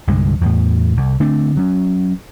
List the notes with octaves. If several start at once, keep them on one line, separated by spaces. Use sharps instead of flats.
C2 G2 D3 G#3
E2 A2
C2
D3 A3 C4 D4
F#3 C#4